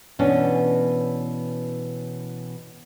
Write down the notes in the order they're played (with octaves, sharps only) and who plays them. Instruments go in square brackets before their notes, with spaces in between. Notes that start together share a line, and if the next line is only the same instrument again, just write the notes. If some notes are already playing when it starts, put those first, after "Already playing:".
[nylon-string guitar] B2 E3 C#4 D4